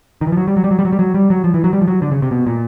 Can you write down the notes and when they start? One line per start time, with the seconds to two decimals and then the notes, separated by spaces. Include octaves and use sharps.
0.21 D#3
0.27 E3
0.32 F3
0.37 F#3
0.48 G3
0.57 F#3
0.64 G3
0.71 F#3
0.79 G3
0.85 F#3
0.93 G3
0.99 F#3
1.14 G3
1.30 F#3
1.44 F3
1.54 E3
1.64 F#3
1.73 G3
1.81 F3
1.88 F#3
2.02 D3
2.12 C#3
2.22 C3
2.31 B2
2.47 A#2